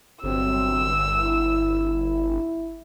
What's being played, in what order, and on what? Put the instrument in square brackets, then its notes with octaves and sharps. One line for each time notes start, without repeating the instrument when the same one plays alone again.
[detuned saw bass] G1 [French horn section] C3 F#3 C4 [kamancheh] E6
[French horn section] E4